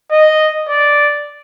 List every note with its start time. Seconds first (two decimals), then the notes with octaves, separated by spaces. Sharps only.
0.12 D#5
0.69 D5